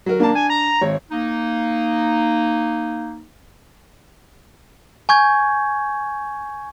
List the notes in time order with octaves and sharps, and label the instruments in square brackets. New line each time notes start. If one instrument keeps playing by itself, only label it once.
[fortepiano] F#3 A#4
[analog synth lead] A#3 [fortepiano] D4 A5
[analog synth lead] G#5
A#5
[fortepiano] G#1 C#5
[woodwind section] A#3 D#4
[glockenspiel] G#5 C#6 G6 G#6